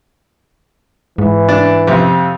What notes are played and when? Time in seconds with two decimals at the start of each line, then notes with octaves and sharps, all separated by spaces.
1.18 G#2 E3
1.49 D4
1.87 F2 C3